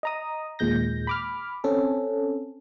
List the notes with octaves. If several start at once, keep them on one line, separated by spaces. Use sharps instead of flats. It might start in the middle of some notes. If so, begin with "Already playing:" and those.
D#5 A#5 D#6
D#2 A#2 G#3 G6 A#6
B5 D6 F6
C4 C#4 A4